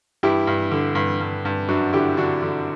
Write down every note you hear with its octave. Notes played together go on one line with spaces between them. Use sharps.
G2 E4 G4
G2
D3
G2
G2
G2
F#2 D4 F#4
D3 E4 G4
D3 D4 F#4
D3